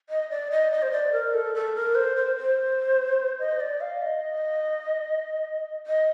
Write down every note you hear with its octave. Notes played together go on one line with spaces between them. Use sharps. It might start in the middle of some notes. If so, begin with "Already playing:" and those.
D#5
D5
D#5
D#5
C5
D5
A#4
A4
A4
A#4
C5
C5
C5
D#5
D5
F5
D#5
D#5